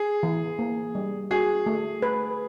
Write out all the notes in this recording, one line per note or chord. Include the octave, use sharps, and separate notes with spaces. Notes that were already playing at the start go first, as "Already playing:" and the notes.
Already playing: G#4
E3
A#3
G3
F#4 G#4
A3
B4